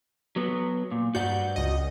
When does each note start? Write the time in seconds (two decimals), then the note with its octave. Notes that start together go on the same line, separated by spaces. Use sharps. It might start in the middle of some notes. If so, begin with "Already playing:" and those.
0.36 F#3 B3
0.91 A#2
1.15 G2 F#4 D5 F#5 G6
1.56 C#2 D#5